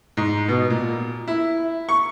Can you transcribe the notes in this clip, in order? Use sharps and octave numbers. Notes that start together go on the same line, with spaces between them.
G#2
B2
A#2
E4
C#6